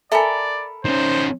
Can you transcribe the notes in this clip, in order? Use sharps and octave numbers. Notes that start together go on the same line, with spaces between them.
A4 A#4 D5 E5 G#5 B5
D#3 C#4 C5